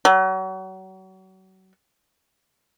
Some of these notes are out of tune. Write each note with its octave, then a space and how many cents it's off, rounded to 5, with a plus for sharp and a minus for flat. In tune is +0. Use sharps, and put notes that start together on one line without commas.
F#3 +35